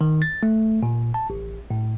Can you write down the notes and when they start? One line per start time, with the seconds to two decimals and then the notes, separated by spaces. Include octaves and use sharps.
0.01 D#3
0.22 A6
0.43 A3
0.83 A#2
1.14 A5
1.30 A1
1.70 A2